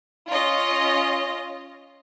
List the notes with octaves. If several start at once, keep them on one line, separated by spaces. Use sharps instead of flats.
C#4 F4 D#5